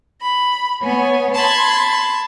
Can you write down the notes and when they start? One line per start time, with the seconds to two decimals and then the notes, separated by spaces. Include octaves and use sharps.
0.21 B5
0.81 B3 C#5 G#5
1.34 A5 B5 C6 G#6